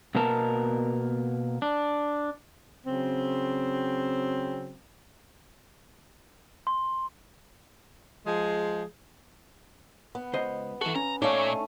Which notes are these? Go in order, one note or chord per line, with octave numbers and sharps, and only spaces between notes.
B2 A#3 B3 A#4 A5
D4
C#3 F#3 C4
C6
F3 G#3 G#4
B3
C#2 C5 D#5
F#2 E3 F#4 A4
C#4 A#5
A#2 A3 C#4 D#4 C#5 D5 F5